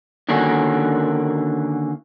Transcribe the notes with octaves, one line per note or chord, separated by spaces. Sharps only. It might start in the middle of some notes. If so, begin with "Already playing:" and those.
D3 D#3 A#3 C#4 D4 F#4